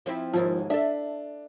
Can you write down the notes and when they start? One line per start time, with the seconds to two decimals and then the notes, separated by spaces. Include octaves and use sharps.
0.06 F3 C4 E4
0.33 D#2 G#2 F3
0.70 D4 A4 E5